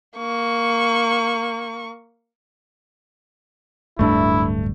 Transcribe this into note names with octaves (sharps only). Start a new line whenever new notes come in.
A#3 C#6
D1 G2 A3 D4 E4